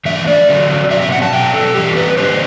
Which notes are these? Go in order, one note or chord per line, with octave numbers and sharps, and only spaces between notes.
E3 A3 D4 E5
D5
D3 F#3 C4
B2 F#3 C4 E5
E5
F#5
A5
B2 F#3 C4 G5
A4
A2 E3 G3 C4 G4
B4
D3 G3 D4 C5